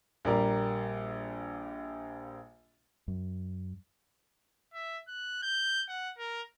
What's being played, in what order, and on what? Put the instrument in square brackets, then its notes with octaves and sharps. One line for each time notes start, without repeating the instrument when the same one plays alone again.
[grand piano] A#1 G3 A#3 A#4 D5 A#5
[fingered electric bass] F#2
[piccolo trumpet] E5
F#6
G6
F#5
A#4